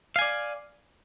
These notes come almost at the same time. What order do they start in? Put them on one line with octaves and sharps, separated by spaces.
F5 G#5 D5